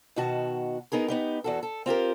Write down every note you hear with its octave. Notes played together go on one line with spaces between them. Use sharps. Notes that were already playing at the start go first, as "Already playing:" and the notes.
B2 D#3 F#4 A5
B3 D#4 G#4 A#4
B3 D#4 G4
E2 F#4 A4
A4
C4 F4 G4 A#4